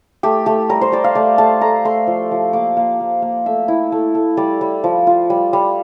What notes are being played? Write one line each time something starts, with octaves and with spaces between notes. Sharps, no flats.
A3 G4
A3 G4
G3 A#4
C5
G3 D5
F5
A3 D5
A3 A5
A3 A#5
A3 C6
F3
F3
A#3 D6
A#3
A#3
A#3
A3 E5
E4
A3
A3
G3 D5
G3
F3
F4
G3
G3